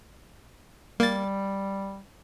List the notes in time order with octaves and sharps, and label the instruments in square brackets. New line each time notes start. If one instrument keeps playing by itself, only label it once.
[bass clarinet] G3 [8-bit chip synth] A#3 A6